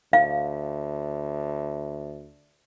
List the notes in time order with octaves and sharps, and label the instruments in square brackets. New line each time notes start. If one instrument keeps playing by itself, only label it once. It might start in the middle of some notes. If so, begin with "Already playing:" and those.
[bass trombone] D2 [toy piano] F5